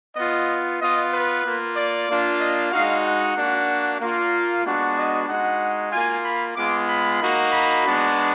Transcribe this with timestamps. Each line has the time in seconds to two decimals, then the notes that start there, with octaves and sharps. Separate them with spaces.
0.16 B3 F4 D#5
0.81 B3 F4 D#5
1.13 B4
1.44 A#3 F4
1.77 D5
2.09 A#3 D4 F4
2.41 D#5
2.72 G#3 D#4 F#4 F5
3.04 F#5
3.36 A#3 D4 F#4
4.01 A#3 F4
4.65 G#3 B3 D4 F#4
4.96 D#5
5.28 G#3 D#4 F#4 F#5
5.92 A#3 F4 G#5
6.25 B5
6.56 G#3 B3 F4 D6
6.89 B5
7.20 A#3 D#4 F#4
7.52 B5
7.85 G#3 B3 D4 F#4